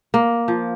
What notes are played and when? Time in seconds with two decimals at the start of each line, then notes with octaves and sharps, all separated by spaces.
0.14 A#3
0.48 F3